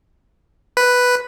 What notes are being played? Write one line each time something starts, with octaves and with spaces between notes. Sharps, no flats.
B4